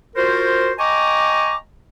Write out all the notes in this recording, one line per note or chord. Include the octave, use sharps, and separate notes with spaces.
F4 F#4 A#4 C5
D#5 G5 G#5 A#5 C#6 D6